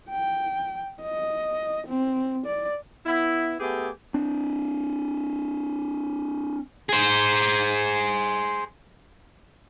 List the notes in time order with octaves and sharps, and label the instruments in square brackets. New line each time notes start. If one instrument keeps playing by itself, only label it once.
[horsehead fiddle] G5
D#5
C4
D5
[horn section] B3 E4
A3 B3 G4 G#4
[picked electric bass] C4 D4
[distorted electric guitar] G#4 C5